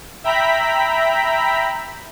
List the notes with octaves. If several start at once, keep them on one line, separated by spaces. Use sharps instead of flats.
E5 G5 A#5 B5 B6